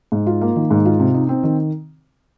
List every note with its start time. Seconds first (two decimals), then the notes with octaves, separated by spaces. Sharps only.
0.12 G#2
0.27 F4
0.41 A#3
0.56 D#3
0.71 G#2
0.85 F4
1.00 C3
1.14 D#4
1.29 C4
1.43 D#3